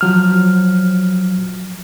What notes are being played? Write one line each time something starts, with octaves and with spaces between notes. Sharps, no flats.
F3 F#3 F6